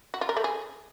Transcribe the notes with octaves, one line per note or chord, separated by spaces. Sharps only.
F#4
F4
A#4
A3
G#4